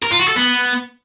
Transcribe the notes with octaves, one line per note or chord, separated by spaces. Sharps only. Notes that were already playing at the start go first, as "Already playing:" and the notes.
A#4
F4
F#4
A4
B3